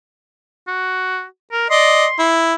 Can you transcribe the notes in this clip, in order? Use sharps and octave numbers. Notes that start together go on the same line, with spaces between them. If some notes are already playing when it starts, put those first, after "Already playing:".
F#4
A#4
D5 D#5 C6
E4